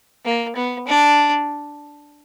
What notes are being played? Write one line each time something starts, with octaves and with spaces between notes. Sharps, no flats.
A#3
B3
D4